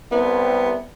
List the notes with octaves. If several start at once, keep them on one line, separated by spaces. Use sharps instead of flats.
C2 B3